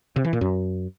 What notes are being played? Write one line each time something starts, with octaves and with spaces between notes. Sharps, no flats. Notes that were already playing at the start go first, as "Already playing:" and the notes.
C3
E3
A#2
F#2